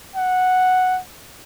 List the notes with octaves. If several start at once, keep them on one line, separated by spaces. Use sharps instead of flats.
F#5